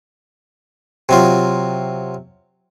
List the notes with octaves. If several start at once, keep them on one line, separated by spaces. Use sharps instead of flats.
C3 F#3 F4